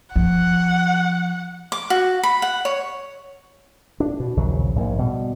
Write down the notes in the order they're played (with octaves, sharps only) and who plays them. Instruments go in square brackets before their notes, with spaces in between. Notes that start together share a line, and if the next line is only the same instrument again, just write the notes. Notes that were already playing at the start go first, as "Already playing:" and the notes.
[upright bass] F3 [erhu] F#5
[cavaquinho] D6
F#4
B5
F#5
C#5
[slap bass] D4
B2
A#1 D#2 C#3 F#3
A#1 G#2 A#3
B2 G3